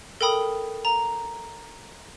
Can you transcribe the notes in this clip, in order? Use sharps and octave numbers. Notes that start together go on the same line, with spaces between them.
A4 A#4 G5 B5 D#6
A#5